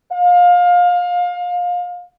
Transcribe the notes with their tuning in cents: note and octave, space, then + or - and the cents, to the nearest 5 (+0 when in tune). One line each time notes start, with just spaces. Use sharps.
F5 +25